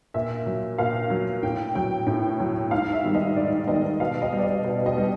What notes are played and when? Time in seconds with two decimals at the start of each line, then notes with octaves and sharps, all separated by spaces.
0.14 A#2 E5
0.46 F#3
0.78 A#2 F5
1.10 F#3
1.43 A2 G5
1.75 F#3 G5
2.07 A2 G5
2.40 F#3
2.71 G#2 F5
2.93 E5
3.04 D#3 G3
3.15 D#5
3.36 G#2 D5
3.68 D#3 G3 D#5
4.00 B2 F5
4.22 D#5
4.33 G3
4.39 D5
4.43 D#5
4.64 B2 D#5
4.86 D#5
4.97 G3